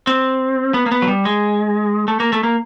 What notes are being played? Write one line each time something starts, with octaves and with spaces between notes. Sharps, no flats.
C4
B3
A#3
B3
F#3
G3
G#3
A3
A#3
A3
A#3